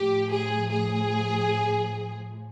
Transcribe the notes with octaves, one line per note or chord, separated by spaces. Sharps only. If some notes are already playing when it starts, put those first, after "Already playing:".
Already playing: A2 F3 G4
G#4
G#4